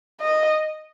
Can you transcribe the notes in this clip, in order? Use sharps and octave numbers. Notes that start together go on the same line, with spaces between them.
D#5